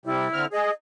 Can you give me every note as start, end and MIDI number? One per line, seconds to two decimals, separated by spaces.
0.05 0.28 48
0.05 0.28 55
0.05 0.47 64
0.33 0.45 50
0.33 0.45 60
0.33 0.45 89
0.52 0.71 68
0.52 0.72 75